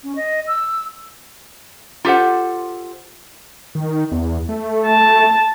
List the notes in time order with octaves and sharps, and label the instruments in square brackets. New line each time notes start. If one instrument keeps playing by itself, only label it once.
[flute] C#4
D#5
E6
[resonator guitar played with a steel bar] F4 G4 A4 C5 F#5
[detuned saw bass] D#3
E2
A3
[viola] A5